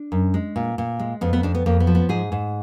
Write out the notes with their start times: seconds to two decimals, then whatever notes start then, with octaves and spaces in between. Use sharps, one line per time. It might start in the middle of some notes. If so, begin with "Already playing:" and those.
Already playing: D4
0.12 F#2
0.34 G#3
0.56 A#2
0.78 A#2
0.99 G#3
1.21 F2 B3
1.33 B3
1.43 F2 D4
1.55 B3
1.66 F2 A#3
1.80 B3
1.87 F3
1.95 B3
2.09 G#2 G#4
2.32 G#2